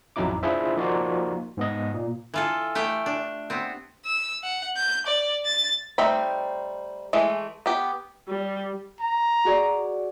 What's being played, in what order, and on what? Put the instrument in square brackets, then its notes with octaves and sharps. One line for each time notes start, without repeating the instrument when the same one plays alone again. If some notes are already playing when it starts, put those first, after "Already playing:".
[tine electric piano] A1 F2 F#3 D#4 E4 D6
D4 E4 F4 G#4 C5 E5
F3 A#3 D#4 F4 F#4 D5
G#2 B3 D#5
A#2
[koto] E3 F4 A4
A3 G4 G5
D4
B3 C4
[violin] E6
F#5
G6
D5
A6
[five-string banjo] G3 A3 C4 D#4 B5
E3 G#3 A3
B3 G4
[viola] G3
[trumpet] A#5
[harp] F#4 G#4 D5